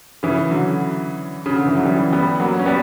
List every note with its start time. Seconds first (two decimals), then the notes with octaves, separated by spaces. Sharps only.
0.23 C#3 E3
0.50 D3 F#3
1.46 C#3
1.56 D3
1.66 E3
1.75 F#3
1.85 E3 G3
2.13 G3 B3
2.40 F#3 A#3
2.59 C#4
2.66 G3 B3